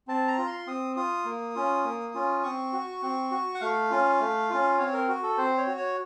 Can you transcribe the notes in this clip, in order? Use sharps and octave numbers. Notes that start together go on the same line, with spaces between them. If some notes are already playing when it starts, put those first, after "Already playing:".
C4 A5
A#5
F4
C6
C4 D#6
F4 D#6
A#3
C#4 F4
A#3
C#4 F4
C4 C#6
F#4
C4
F#4
F#5
A3 F5
C#4 F4
A3
C#4 F4
C4 C#5
A#4
F#4
A4
C4 C5
C#5
F#4
C#5